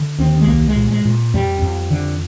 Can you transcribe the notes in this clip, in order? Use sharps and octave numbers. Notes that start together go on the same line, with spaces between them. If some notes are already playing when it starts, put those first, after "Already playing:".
Already playing: D3
D#2 C4
G#3
C2 A#3
G#3
A#2
G#3
A#2
F2 G3
F2
D3